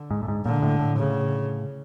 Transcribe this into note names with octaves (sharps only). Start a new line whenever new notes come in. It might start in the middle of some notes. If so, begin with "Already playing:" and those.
Already playing: D3
G#2
A2
G#2
A#2 D3
A2
A2
C#3